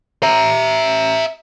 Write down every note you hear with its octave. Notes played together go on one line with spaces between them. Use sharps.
E5 A#5